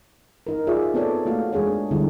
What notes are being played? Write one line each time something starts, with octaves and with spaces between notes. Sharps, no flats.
D#4 A#4
F4 G#4 C5 D5 E5
B3 C4 A4 C#5 D5
A3 A#3 F#4 F5
G#3 D4 G#4 C#5
D3 G3 G#3 C4 D4 E4